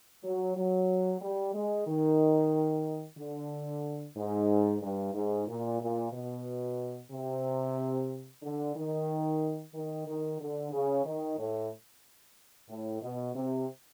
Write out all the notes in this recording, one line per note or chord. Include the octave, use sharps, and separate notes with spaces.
F#3
F#3
G3
G#3
D#3
D3
G#2
G2
G#2
A#2
A#2
B2
C3
D3
D#3
D#3
D#3
D3
C#3
D#3
A2
A2
B2
C3